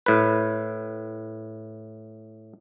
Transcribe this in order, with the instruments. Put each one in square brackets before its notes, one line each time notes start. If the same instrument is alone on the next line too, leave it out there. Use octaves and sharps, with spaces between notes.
[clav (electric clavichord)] A2 B4